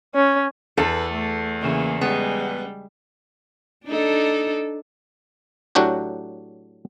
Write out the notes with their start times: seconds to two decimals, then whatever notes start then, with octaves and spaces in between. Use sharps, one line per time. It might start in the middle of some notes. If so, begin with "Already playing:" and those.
0.15 C#4
0.77 E2 A4 B4
1.12 A3
1.61 C#3 E3 A#3
2.01 G3 G#3 B3
3.85 D4 D#4 A4
5.75 A2 F#3 D4 F#4 G4